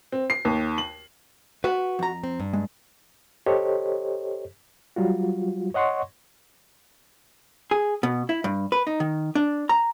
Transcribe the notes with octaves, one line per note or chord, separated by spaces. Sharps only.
C4
C7
D#2
F#7
F#4 B4 F#5
F2 A#5
C4
G2
G#3
G4 A4 C5 C#5 D#5
F#3 G3 F4 F#4
C#5 D#5 F#5 C6 C#6
G#4
B2
E4
G2
B4
D#4
D#3
D4
A#5